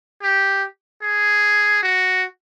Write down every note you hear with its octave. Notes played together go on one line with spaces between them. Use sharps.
G4
G#4
F#4